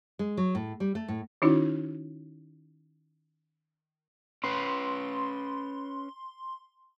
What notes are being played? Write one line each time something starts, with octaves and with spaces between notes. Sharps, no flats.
G#3
F#3
A2
G3
A3
A2
D#3 C#4 D#4 E4 F#4
C#4 B4 C6